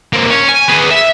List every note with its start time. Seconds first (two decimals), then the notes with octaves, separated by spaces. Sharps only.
0.13 A#3 C4
0.29 C#4
0.49 G#5
0.68 G#4 B4
0.91 E5